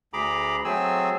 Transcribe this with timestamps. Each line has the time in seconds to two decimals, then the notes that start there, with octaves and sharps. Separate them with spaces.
0.13 D2 G#4 A#5 B5 D6
0.65 F#3 A3 C4 G#4 G#5 E6